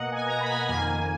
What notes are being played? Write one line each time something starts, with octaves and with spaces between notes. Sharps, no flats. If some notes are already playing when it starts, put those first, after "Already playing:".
Already playing: B2 A#3 D#5 F#5
G#5
A#5
B5
G#5
A#5
F2 D#3 A#3 G#5